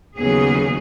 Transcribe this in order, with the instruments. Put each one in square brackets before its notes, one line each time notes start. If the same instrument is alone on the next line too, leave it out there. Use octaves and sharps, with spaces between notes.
[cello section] D#2 C#3 F#3 B3 G#4